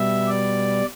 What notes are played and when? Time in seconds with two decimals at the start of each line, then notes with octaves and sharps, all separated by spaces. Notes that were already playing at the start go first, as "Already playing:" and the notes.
Already playing: B2 G3 E5
0.27 D5